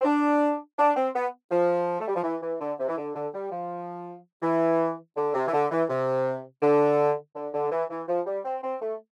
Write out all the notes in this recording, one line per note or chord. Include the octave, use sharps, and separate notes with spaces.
C4
D4
D4
C4
B3
F3
A3
G3
F3
E3
E3
D3
C3
E3
D3
D3
G3
F3
E3
D3
C3
E3
D3
E3
C3
D3
D3
D3
E3
E3
F3
G3
C4
C4
A3